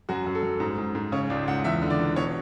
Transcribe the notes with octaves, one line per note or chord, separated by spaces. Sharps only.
F#2 F#4
F#2
A4
F#2
G#2
G#2
G#2
C#3 C#5
C#2 D5
C#2 F#5
E2 E5
D3
D5
E2
B2 C#5